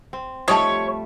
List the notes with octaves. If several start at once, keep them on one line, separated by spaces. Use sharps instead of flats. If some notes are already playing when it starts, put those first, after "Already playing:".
C4
F3 G3 A3 D#4 C#5 E5 A5